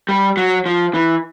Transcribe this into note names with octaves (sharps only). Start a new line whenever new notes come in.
G3
F#3
F3
E3